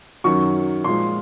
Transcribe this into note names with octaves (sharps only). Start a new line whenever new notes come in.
F#2 D#3 F#3 C#6
A#2 F3 G#3 C6